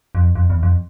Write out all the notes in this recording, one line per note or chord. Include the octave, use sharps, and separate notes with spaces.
F2
F2
E2
F2